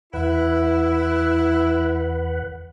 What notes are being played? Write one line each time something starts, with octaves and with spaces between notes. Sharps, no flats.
E2 E4 B4 F#5